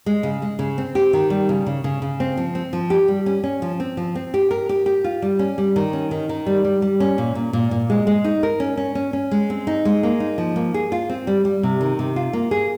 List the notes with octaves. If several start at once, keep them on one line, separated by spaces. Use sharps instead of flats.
G#3
C#3
G#3
C#3
C4
G4
D#3
G3
C#3
C#3
C#3
C#3
C4
F3
C4
F3
G4
G3
C#4
C#4
F3
C4
F3
C4
G4
A#4
G4
G4
F4
G3
C#4
G3
D#3
C#4
D#3
D#3
G3
G3
G3
C#4
A#2
A#2
A#2
A#2
G#3
G#3
D#4
A#4
C#4
C#4
C#4
C#4
G#3
C4
D#4
G#3
A#3
D#4
F3
A#3
G#4
F4
C4
G3
G3
C3
D#3
C3
F4
A#3
G#4